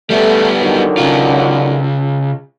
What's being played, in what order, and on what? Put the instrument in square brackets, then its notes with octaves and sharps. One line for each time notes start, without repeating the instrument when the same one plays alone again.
[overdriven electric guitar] G3 B3 [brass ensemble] A3
[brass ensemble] D3 D#3 F#3
[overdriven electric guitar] C#3 F4